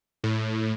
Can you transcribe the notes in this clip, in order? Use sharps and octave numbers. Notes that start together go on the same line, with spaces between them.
A2